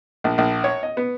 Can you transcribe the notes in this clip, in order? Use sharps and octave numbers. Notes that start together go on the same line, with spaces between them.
A#1
A#1
C#5
D#5
B3